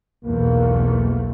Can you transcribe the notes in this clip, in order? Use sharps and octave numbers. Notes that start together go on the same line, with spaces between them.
B1 E2 A3 A#3